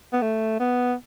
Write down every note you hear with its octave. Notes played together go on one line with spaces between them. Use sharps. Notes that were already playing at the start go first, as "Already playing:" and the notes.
B3
A3
B3